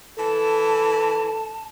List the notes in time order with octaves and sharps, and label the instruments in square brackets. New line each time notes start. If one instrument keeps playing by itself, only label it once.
[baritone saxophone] E3 [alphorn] A4 [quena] A5